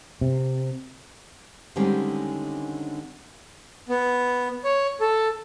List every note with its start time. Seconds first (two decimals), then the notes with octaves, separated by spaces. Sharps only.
0.21 C3
1.76 D3 D#3 G3 G#3 C4 C#4
3.89 B3
4.64 C#5
5.00 A4